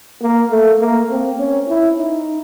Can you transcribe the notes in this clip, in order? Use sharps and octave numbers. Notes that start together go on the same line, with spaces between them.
A#3
A3
A#3
C4
C#4
E4
D#4